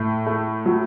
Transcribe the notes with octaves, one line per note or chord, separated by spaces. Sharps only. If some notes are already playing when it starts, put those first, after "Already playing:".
Already playing: A2
A3
F#3